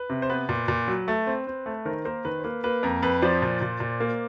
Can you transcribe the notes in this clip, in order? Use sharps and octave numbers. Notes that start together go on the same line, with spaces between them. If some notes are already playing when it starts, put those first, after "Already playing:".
Already playing: B4
C3
C5
B3 B4
A#2
A#2
F#3
A3
C4
C4
A3
D#3 A#4 C5
A#3 A#4 C5
D#3 B4
C5
A#3 B4
A#3 B4
F2 A#4
F2 B4
F3 C5 D5
A#2
A#2
A#2
A#3